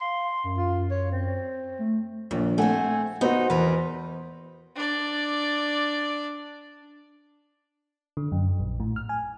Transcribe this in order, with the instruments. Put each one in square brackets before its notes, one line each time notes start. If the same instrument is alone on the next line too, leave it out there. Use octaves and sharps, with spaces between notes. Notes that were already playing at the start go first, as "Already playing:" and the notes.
[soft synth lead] F5 [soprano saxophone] C6
[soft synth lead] F#2
[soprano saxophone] F4
C#5
C4
[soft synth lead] A3
[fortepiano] A#1 [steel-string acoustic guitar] D#2
[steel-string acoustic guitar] A3 C4 [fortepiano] A4 F#5 [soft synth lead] G#5
[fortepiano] B3 F#4 [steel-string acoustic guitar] D#4 [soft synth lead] C5
[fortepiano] E2 [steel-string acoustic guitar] A#4 B4
[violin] D4 D5
[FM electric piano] D3
F#2
A#1
A2
F6
G#5